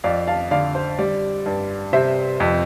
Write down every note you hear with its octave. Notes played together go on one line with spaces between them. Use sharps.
F2 D5 F5
F5 A5
D3 D5 F5
C5
G3 D5
G2
C3 C5 E5
F2